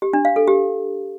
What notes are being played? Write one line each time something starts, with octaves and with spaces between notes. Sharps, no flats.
G4
D4
F5
A4
G4